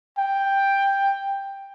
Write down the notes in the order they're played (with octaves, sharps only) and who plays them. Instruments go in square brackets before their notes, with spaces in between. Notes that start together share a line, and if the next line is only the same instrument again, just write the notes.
[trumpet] G5